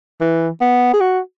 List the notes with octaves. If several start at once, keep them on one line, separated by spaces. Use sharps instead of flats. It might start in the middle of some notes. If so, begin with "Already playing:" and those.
E3
B3
G#4
F#4